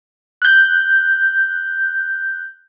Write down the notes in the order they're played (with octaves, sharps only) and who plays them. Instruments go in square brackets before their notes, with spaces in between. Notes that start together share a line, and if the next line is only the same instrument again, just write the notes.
[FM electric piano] F#6 G6